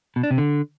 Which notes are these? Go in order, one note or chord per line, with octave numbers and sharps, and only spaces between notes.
B2
D4
C3
D3